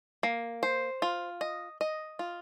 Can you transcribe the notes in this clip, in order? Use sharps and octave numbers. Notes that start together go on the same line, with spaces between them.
A#3
C5
F4
D#5
D#5
F4